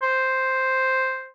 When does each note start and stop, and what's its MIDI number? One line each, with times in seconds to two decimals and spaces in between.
0.03 1.27 72